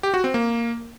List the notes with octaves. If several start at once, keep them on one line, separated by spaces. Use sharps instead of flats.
G4
F#4
C4
A#3